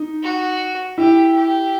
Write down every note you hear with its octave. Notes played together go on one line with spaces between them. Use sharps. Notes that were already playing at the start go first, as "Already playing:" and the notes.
Already playing: D#4
F#4
E4 G4
G4